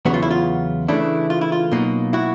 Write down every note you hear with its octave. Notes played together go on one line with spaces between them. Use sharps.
E2 C#3 F#3 B3 F#4
F4
E4
F4
C#3 E3 A3 D4 E4
F4
E4
F4
B2 F#3 A#3 D#4
E4 F#4